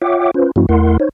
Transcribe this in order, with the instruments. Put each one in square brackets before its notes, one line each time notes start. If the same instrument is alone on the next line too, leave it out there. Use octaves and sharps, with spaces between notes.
[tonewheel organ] F4 C#5 E5 F#5 G5 D6
C#4 F4 B4 C5
G2 F3 A#3 C#4 E4 F#4
E2 A3 E4 A#4 F#5 C6
D#4 C5 C#5